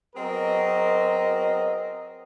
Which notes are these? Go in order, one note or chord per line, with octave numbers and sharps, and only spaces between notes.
F#3 B3 C4 G#4 A#4 D#5